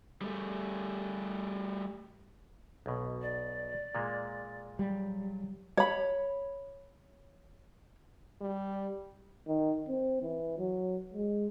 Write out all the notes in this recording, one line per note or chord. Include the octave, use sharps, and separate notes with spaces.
G3 A3
B1 B2
D5
A#2 G#3 A#3
F#3 G3
C#5 B5
G3
D#3
C4
E3
F#3
G#3